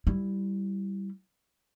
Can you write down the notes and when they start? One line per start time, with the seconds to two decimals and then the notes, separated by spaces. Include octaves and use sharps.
0.07 G3 E4